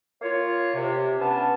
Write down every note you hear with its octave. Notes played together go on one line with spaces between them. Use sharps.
A#3 F4 C#5
C3
B3 C#4 D4 A5